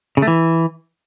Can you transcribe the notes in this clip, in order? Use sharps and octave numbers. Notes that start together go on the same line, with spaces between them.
C#3
A3
E3